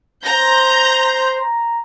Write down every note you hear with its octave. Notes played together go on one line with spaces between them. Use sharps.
C5 A#5 G6 A#6
A#5